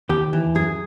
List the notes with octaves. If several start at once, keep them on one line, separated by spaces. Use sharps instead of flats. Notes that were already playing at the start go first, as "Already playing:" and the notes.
D#2 G4
E3
F#2 G#4